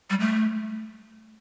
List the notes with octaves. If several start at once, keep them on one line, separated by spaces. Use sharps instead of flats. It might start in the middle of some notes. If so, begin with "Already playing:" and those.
G3
A3